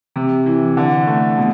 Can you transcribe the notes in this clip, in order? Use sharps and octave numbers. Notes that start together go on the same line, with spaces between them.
C3
E3
D3
A3
B2